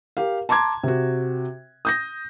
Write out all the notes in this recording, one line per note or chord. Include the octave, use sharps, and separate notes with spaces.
G4 A#4 F5
A5 A#5 C6 D6 G#6
C3 F#4
D#6 G6 A#6